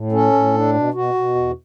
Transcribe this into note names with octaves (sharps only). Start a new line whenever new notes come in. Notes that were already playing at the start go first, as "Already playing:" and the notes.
Already playing: A2
C#4 A4
A2
D4
B2
B2 F#4
B2
E2